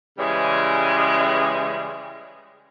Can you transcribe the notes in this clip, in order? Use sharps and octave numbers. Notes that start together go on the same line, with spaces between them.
C#3 E3 G3 G#3 C#4